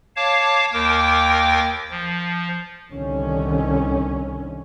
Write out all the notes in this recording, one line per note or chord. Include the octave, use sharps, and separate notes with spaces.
C#5 F5 A5 D6
D#2 A#4 G5 D6
F3
C2 D3 D#3 C#4